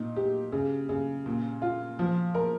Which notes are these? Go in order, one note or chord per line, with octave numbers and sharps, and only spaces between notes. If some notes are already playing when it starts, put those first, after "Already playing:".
Already playing: A#2 D#4
G4
C#3
C#3
A#2
F4
F3
A#4